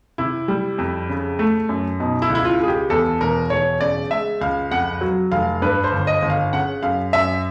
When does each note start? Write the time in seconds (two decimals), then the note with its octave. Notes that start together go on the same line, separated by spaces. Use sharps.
0.18 C3 E4
0.48 G3
0.78 F2
1.09 C#3
1.39 A3
1.69 F#2
2.00 B2 D#4
2.22 E4
2.30 C#2
2.35 E4
2.45 F4
2.60 C#2 G#4
2.68 G4
2.90 E2 A4
3.21 E1 A#4
3.50 E1 C#5
3.81 C#3 D5
4.11 G#3 E5
4.41 C#2 F5
4.71 F2 F#5
5.01 F#3
5.31 F1 F5
5.62 G2 B4
5.84 C5
5.92 G1
6.07 D#5
6.22 G1
6.30 F5
6.53 C#3 F#5
6.83 F#2 F5
7.13 F#2 E5